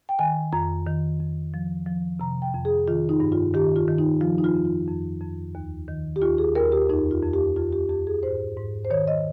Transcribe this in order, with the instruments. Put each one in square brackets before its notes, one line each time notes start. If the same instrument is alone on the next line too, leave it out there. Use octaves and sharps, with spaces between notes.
[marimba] G5
D#3 G#5
F2 A#5
D#3
F2
F3
F3
C3 A#5
G5
F2
G#4
D#3 F4
D#4
G2
F4
D#3 G4
F4
D#3
D#4
F3 F4
D#4
F4
F2
F4
F2
F2
D#2
D#3
G4
D#2 F4
G#4
D#2 A#4
G4
F2 D#4
F4
F2
G4
F2 F4
G4
F2 G4
G#4
G#2 C5
G#2
C5
D#3 C#5
D#5